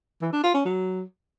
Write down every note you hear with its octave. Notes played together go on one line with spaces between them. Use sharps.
E3
D4
F4
C#4
F#3